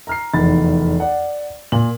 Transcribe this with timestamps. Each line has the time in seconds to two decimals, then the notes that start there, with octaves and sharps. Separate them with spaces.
0.07 A#5 F6 C7
0.33 F1 E2 D#3 B5 A6
1.00 D5 F#5
1.72 A#2 F#7